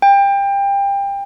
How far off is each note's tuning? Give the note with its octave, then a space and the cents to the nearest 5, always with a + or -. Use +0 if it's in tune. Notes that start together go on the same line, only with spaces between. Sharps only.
G5 +25